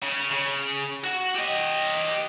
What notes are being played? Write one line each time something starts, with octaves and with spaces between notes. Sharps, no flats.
C#3
C#3
F#4
G4 D#5